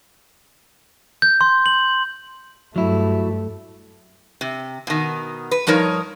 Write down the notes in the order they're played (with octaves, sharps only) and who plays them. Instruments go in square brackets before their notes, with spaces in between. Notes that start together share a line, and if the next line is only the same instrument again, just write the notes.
[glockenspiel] G6
C6
F#7
[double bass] G2 A3 [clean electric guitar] F#3 E4
[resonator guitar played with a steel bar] C3
B2 D#3
B4
G2 F3 D#4 A#4 C#5